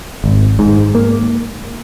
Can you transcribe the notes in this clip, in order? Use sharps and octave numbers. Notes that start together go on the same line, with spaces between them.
G#1
G#2
A#3